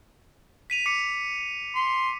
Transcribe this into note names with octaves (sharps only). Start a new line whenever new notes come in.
B6 D#7 F7
D6 B6 C#7
C6